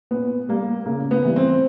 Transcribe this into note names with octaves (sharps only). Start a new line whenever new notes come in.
A#2 B3
G3 A#3
C#3 A#3
B3
E3 G3
C4